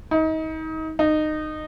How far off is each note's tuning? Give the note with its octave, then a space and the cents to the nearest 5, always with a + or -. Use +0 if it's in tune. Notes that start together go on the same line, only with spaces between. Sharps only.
D#4 +30
D#4 -20